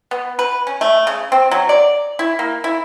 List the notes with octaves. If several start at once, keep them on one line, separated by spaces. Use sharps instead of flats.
B3
B4
C#4
A3
C#3
C4
F#3
D5
E4
A#3
E4